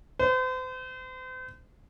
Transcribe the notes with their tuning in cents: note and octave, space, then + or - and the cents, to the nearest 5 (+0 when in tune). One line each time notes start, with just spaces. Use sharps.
C5 -40